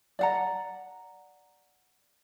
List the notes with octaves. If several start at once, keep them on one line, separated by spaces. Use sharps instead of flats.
D5 F#5 A#5